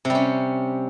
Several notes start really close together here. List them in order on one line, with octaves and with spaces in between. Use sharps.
C3 G3 C#4